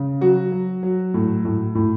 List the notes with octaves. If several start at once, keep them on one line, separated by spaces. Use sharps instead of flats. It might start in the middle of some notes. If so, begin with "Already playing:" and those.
Already playing: C#3
F#3 F#4
F#3
F#3
A2
A2
A2